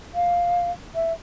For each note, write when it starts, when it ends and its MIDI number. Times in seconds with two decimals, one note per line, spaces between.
0.15 0.72 77
0.95 1.13 76